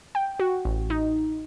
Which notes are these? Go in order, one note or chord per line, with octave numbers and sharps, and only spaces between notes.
G5
F#4
A1
D#4